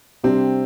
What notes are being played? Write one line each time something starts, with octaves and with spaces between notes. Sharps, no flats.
C3 G3 C4 D4 G4 C5